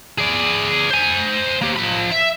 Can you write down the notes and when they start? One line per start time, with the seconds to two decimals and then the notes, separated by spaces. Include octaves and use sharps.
0.19 G#4 D5
0.90 C5 G#5
1.62 A#3 G4
1.77 F3 B5
2.12 E5